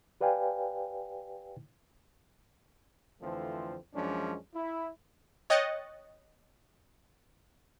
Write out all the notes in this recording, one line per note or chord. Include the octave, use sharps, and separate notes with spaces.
G4 B4 D5 F5 G5 G#5
F2 D3 E3 F3 A3 C4
F#2 F3 G#3 C#4 D4
E4
C#5 D#5 G5 F#6 A6 C#7